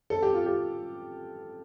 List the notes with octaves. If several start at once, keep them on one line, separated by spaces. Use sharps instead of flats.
A4
G4
F4
G4